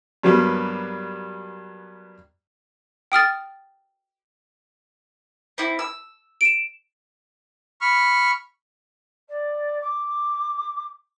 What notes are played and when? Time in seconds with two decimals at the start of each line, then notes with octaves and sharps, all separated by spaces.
0.23 G2 F#3 G3 A#3 B3
3.12 G5 D#6 F6 A6
5.58 C4 E4
5.79 E6
6.41 D7 E7
7.81 B5 C#6 F6
9.28 D5
9.81 D6